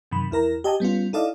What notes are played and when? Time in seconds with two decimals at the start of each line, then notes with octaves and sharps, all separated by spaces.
0.12 F#2 C3 D#3 B5
0.31 E2 E4 A#4 A#5
0.64 G4 D#5 G#5 A5 D#6
0.80 G3 B3 C#4 F4
1.13 D#4 E4 A4 D5 D#5 F5